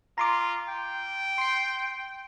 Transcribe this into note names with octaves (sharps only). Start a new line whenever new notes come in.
F4 A#5 C6 D6
G5
C6 C7